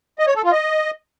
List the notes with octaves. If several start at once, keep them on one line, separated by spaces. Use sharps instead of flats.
D#5
C#5
A4
F4
D#5